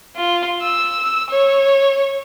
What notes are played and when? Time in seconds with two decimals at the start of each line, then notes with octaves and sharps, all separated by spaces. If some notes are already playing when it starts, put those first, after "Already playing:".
0.16 F4
0.62 E6
1.30 C#5